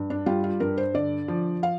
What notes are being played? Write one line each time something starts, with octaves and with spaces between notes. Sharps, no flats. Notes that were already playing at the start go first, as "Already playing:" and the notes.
Already playing: G2
D4
G3 F4
F4
G2 A#4
C5
D3 D5
F3
F5